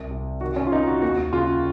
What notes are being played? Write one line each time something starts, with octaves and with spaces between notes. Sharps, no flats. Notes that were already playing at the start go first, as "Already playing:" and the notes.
Already playing: C2
C3
D#3 F#4
C#4
F4
D#3 D#4
F#4
D#2 F#4
C#3 F4